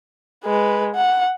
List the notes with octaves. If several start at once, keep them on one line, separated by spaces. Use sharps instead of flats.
G#3 B4
F#5